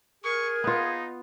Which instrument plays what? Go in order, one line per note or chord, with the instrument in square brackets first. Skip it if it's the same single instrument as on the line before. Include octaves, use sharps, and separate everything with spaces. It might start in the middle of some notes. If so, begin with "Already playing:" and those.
[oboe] G#4 [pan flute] A#4 [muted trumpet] C#6
[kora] B3 F4 [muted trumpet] D#4